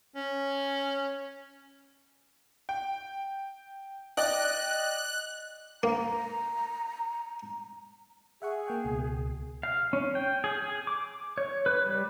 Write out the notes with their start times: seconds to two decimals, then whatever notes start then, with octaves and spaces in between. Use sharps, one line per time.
0.16 C#4
2.69 G5
4.17 D5 D#5 G5 F#6
5.83 A#3 A#5
8.42 G#4 E5 F#5 C#6
8.68 A#3 G5
8.85 C#2 B2
9.63 F5
9.93 C#4
10.15 G5
10.44 G#4
10.62 G#4
10.87 D6
11.38 C#5
11.66 B4
11.86 G3